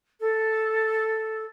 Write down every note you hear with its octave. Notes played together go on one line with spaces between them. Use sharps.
A4